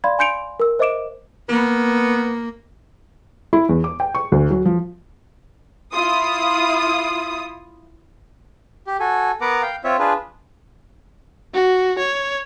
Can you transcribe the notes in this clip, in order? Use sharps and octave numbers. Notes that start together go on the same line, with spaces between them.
D5 F5 B5 C6 G#6
G#5 C6 G6 C#7 D7 F7
A#4 E6
C5 D#5 E5 D6 D7 E7
A#3 B3
E4
E2
D6
G5
C#6
D2
F#3
F3
E4 F4 D#6
G4
F#4 A4 G#5
B3 A#4 B4 F#5 A#5 D6
F5 G5
C4 F4 C#5 E5
D4 F4 G#4 B4
F#4
C#5